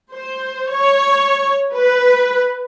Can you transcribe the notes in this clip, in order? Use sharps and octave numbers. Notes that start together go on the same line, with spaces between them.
C5
C#5
B4